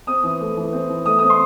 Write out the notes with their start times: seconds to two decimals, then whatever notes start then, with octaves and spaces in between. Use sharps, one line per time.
0.07 C4 D#6
0.23 E3
0.40 A3
0.57 E3
0.73 C4
0.90 E3
1.06 A3 D#6
1.19 C4 D#6
1.30 C6